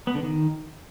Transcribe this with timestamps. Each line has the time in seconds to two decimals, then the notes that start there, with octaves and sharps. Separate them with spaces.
0.07 B3
0.15 D3
0.23 D#3